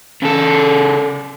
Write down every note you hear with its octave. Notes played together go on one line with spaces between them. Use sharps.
C#3 A4